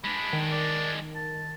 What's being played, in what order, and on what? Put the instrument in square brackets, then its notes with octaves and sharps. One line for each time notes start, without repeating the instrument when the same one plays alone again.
[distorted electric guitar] G#3 D4 [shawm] B5
[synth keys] D#3
[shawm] D5
A5